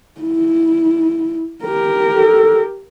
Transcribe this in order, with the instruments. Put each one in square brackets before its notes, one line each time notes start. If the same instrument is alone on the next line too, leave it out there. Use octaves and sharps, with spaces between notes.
[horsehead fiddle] E4
G4 A#4
[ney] A4